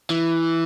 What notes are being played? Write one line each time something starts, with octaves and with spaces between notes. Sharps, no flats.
E3